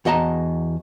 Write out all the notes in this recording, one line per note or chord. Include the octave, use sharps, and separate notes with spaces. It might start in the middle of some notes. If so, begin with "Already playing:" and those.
E2 F#4 D#5 A5 A#5